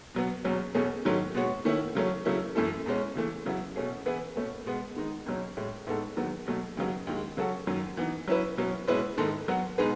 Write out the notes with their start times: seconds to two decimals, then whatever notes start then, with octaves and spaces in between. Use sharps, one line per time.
0.15 B2 F#3 B3
0.45 E2 B2 F#3 C#4
0.75 E2 B2 A3 C#4 G#4
1.05 G#2 D#3 F#3 A3 C#4
1.35 B2 G#3 B3 F#4 C#5
1.65 D#3 A3 C#4 E4
1.95 C#3 F#3 A3 C#4
2.25 C#3 F#3 A3 C#4 E4
2.55 F#2 E3 A3 E4 A4
2.86 E2 B2 G#3 C#4
3.15 C#3 E3 A3
3.46 C#3 F#3 B3 E4
3.76 B2 A3 C#4 G#4
4.06 E3 B3 E4 G#4 B4
4.36 B2 A3 C#4
4.66 B2 G#3 B3
4.96 D#3 G#3 D#4
5.26 C#2 B2 F#3 C#4
5.57 A2 G#3 C#4
5.87 A2 G#3 B3 D#4 A4
6.17 E2 D#3 F#3 B3
6.47 B2 F#3 A3
6.77 D#2 C#3 F#3 B3
7.07 D#2 D#3 G#3
7.37 C#3 F#3 C#4 F#4 A4
7.67 F#2 D#3 F#3
7.97 E3 B3 D#4
8.28 F#3 C#4 E4 B4
8.57 B2 F#3 C#4
8.88 B2 G#3 C#4 E4 B4
9.18 G#2 D#3 G#3 D#4 A4
9.48 F#3 B3 F#4
9.78 B2 G#3 D#4 G#4 B4